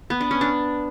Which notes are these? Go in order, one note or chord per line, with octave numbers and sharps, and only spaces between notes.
B3
D4
C#4
D4